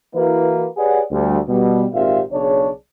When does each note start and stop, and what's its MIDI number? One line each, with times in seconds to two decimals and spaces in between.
0.15 0.66 52
0.15 0.66 58
0.15 0.66 64
0.15 0.66 66
0.15 0.66 71
0.77 1.00 67
0.77 1.00 68
0.77 1.00 71
0.77 1.00 73
0.77 1.00 74
0.77 1.00 78
1.11 1.38 38
1.11 1.38 55
1.49 1.85 47
1.49 1.85 55
1.93 2.21 32
1.93 2.21 46
1.93 2.21 60
1.93 2.21 67
1.93 2.21 76
1.93 2.21 77
2.32 2.70 35
2.32 2.70 49
2.32 2.70 62
2.32 2.70 68
2.32 2.70 73